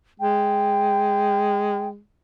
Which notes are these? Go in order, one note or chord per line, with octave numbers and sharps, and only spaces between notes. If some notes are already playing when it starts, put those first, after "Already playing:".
G#3 G5